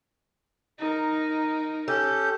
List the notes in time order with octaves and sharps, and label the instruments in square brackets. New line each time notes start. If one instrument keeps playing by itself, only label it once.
[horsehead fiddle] D#4 A#4
[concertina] C#4 G4 [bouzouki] A4 [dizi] G6